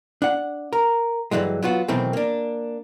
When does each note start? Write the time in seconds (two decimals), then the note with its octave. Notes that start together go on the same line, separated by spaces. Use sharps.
0.22 D4 F#5
0.73 A#4
1.31 G2 D3 E3 F#3 G#3
1.63 F#3 B3 F4 F#4
1.88 B2 D#3 E3 F#3 A3 C4
2.13 A#3 D4